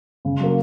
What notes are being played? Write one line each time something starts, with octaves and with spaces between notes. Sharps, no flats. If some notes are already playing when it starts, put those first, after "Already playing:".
C#3
F#3 A#3